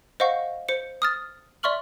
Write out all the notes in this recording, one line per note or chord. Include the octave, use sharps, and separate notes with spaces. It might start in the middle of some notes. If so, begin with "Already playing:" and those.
C5 D#5 F5 F#5 C#6
C5 C#7
D#6 F6 A6
D5 E5 C6 C#6 F6 F#7